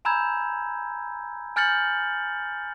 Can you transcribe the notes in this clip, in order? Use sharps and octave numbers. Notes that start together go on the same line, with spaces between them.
G#5 A#5 B5 E6 G6 G#6
G#5 F6 G6 A6 C#7 F#7